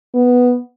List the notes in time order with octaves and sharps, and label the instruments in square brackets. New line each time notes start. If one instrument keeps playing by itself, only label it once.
[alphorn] B3